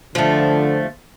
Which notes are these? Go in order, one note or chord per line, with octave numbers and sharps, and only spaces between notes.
D3 F3 A3